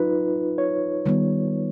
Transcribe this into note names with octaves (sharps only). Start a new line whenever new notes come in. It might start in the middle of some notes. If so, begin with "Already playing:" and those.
Already playing: F#3 D#4 F4 B4
C#5
D#3 G3 B3